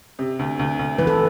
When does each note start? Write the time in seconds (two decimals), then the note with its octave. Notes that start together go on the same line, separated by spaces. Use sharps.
0.19 C3
0.39 D2
0.59 D2
0.79 D2
0.98 E3 B4
1.07 A4